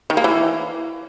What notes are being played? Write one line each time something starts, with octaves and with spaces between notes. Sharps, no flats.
D#3
A#3
E3